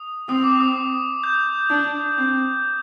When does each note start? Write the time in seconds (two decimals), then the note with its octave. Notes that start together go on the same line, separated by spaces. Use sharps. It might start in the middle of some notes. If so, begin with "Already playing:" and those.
Already playing: D#6
0.28 C4 D#6
0.44 D6
0.61 D#6
1.24 G6
1.70 D4
2.17 C4 G6